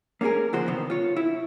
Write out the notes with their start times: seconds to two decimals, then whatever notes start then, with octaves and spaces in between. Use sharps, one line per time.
0.21 A#3 C#4 E4 G#4 A#4
0.53 D2 C#3 F3 F#4 C5
0.68 C3 D#3 F#3 B3
0.90 F4 C#5
1.17 E4